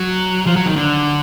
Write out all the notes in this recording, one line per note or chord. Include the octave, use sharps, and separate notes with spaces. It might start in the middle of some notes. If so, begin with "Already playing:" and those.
Already playing: F#3
F3
F#3
D#3
D3